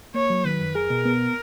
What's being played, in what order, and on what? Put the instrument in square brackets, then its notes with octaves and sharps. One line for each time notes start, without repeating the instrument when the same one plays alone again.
[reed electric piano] A#3 [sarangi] C#5
[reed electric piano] F#3
[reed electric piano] D#3 [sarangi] B4
[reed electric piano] F#2
[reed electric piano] G#4 [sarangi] A#4
[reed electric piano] B2
B3